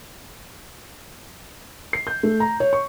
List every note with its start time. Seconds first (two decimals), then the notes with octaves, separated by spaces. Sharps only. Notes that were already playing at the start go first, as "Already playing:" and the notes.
1.93 C7
2.07 G6
2.23 A3
2.40 A#5
2.60 C#5
2.73 C#6